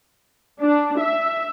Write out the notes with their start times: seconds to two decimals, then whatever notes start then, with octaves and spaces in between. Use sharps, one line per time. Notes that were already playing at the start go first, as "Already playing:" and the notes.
0.62 D4
1.00 E5